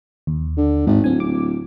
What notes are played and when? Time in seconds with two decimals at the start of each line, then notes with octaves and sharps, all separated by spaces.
0.27 D#2
0.57 D3
0.87 G#1 G#2
1.04 D1 C4 G#5
1.20 D6